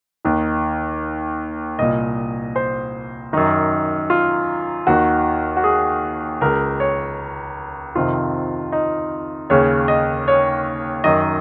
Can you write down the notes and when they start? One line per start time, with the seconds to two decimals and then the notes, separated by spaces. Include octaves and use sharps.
0.25 D#2 D#3
1.79 C2 A#2 D#5
2.56 C5
3.33 F#2 D#3 D#4
4.10 F4
4.87 D#2 D#3 F#4
5.57 F#4
5.64 G#4
6.41 C#2 C#3 A#4
6.80 C#5
7.95 F2 C3 D#3 F4
8.72 D#4
9.50 D#2 C#3 C#5
9.88 D#5
10.28 C#5
11.04 F#2 D#3 D#5